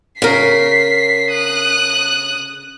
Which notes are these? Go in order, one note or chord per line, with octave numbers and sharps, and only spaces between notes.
C#3 A#4 B6 C7
D#6 F#6